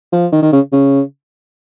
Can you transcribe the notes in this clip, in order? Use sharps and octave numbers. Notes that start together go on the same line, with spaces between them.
F3
D#3
D#3
C#3
C#3